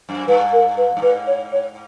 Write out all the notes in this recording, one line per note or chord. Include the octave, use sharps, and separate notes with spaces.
F#2
G2 B4
A#4
B4
G2
G#2 B4
C#5
C#5